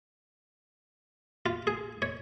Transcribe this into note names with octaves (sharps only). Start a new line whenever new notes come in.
F4
G#4
C#5